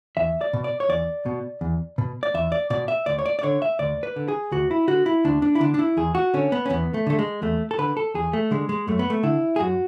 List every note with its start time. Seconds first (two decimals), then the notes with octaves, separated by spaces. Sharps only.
0.17 E2 E5
0.41 D5
0.53 B2
0.64 D5
0.80 C#5
0.89 E2 D5
1.26 B2
1.61 E2
1.98 B2
2.23 D5
2.34 E2 E5
2.52 D5
2.70 B2 D5
2.88 E5
3.06 D2 D5
3.19 C#5
3.26 D5
3.39 D5
3.43 D3 C#5
3.62 E5
3.79 D2 D5
4.03 B4
4.16 D3
4.28 G#4
4.52 D2 F#4
4.71 E4
4.88 D3 F#4
5.06 E4
5.25 D2 D4
5.42 D4
5.55 E4
5.61 D3 D4
5.74 D4
5.79 E4
5.97 E2 G#4
6.15 F#4
6.34 D3 C#4
6.52 B3
6.66 C#4
6.70 E2 B3
6.94 A3
7.07 D3 A3
7.19 G#3
7.42 E2 A3
7.71 A4
7.79 D3 B4
7.97 A4
8.14 E2 G#4
8.33 A3
8.51 D3 G#3
8.69 G#3
8.87 F#2 A3
8.99 B3
9.10 A3
9.23 D3 E4
9.56 G#4
9.60 F#2 F#4